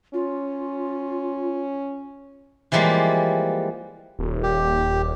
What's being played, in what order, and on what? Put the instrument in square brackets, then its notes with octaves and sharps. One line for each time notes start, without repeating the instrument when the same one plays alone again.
[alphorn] C#4 [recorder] F4
[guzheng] E3 F3 G3 G#3 A#3
[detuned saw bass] D#1
[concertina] G4